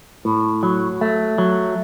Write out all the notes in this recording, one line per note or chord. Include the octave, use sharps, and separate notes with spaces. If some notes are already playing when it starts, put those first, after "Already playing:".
A2
F#3
A3
F#3